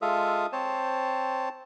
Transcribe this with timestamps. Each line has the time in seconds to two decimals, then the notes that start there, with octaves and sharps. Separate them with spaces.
0.02 G#3 F4 A4 E5 F5 D#6
0.52 C4 C5 C#5 A5